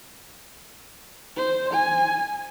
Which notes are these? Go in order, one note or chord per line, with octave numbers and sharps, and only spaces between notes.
C5
G#5